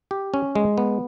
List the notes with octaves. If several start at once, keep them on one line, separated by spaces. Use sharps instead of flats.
G4
C#4
G#3
B3